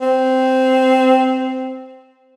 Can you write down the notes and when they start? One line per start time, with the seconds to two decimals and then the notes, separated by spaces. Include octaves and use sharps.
0.01 C4